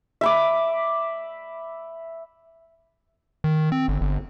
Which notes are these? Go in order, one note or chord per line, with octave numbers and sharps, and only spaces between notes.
E5 B5 D6
D#3
C4
G1
G1